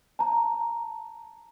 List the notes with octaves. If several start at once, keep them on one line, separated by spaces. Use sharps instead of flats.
A5 A#5